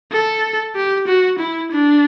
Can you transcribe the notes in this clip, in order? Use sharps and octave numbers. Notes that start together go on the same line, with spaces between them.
A4
G4
F#4
E4
D4